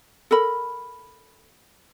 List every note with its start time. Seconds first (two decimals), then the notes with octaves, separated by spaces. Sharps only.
0.31 A4 A#4 B5